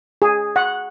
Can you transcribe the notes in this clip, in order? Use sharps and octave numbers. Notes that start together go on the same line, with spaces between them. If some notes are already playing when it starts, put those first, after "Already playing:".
G#4
F#5